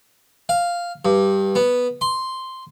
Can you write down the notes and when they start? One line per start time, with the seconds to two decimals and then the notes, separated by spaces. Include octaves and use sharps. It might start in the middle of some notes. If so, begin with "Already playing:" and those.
0.49 F5
1.05 G2
1.55 B3
2.01 C6